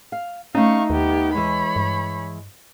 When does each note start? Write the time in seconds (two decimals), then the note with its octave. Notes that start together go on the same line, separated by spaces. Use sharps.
0.12 F5
0.55 A3 C#4 D#4 F5 C#6
0.90 D#2 B3 G4
1.35 E3 G#3 C#5 B5
1.76 G2